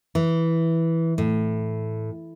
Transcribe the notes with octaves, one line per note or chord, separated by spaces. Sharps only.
E3
A2